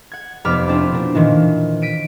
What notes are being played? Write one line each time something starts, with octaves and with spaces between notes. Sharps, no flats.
F#5 G#6
F1 B3 D5 B5 D6 F6
C4 D4 E4 F4
B2 A#3
A#2 D#3 E3
B6 D7 D#7